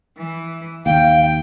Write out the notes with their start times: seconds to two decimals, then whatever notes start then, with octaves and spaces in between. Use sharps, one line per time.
0.17 E3
0.86 D#2 F5 G5